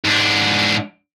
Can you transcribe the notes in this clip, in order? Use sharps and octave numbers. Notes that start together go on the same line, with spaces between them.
G#2 D4